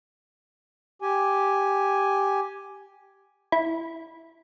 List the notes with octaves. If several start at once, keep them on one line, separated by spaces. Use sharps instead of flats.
G4 G#5
E4